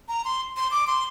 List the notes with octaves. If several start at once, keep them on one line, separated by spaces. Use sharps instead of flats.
A#5
C6
C6
D6
C6